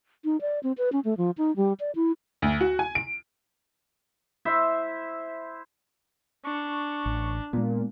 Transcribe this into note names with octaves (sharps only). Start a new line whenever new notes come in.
D#4
D5
C4
B4
C#4
A3
F3
D#4
G3
D5
E4
D2
F#4
G#5
D7
E4 C5 E5
D4 C#6
A1
A#2 G#3 B3